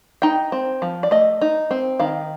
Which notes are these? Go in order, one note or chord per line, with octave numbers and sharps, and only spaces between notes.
D#4 G5
C4
F3
D5
A3 D#5
D#4
C4
D#3 F5